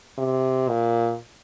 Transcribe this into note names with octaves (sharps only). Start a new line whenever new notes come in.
C3
A#2